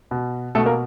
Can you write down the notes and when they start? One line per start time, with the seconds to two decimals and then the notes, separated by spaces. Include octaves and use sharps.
0.11 B2
0.55 B2 A3 A4
0.66 A#3 A#4